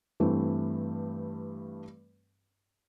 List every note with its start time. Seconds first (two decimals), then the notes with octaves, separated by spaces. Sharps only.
0.20 G2 E3 A3 C4